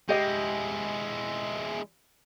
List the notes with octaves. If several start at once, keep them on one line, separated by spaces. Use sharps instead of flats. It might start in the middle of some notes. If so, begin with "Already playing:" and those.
G#3 E4 G4 D#5